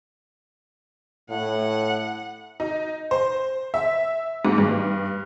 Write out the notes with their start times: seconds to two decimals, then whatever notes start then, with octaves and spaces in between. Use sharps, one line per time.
1.30 A2 F#5
2.60 D#4
3.11 C5
3.74 E5
4.45 G#2
4.58 G2